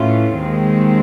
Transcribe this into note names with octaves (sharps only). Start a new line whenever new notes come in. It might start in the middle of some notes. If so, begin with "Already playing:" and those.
Already playing: A2 E3 A3 C#4 F4
D#2 D#3 G#3 C4